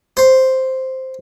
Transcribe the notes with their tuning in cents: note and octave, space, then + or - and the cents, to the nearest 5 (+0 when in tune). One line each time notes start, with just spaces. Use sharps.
C5 +0